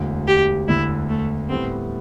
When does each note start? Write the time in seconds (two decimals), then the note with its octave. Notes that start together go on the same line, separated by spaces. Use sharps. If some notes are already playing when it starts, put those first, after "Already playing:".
Already playing: E1 D2 D3
0.28 G4
0.68 E1 D2 D3 E4
1.09 A3
1.49 A2 G3 B3 C4